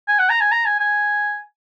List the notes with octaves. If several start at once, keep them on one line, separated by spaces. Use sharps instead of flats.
G#5
F#5
A#5
G#5
A#5
G#5
G#5